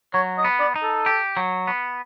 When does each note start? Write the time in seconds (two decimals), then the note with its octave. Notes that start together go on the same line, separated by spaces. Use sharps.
0.14 F#3 C#5
0.38 D#5
0.45 B3
0.60 D5
0.76 D#4
0.83 A4
1.06 G4
1.37 F#3
1.67 B3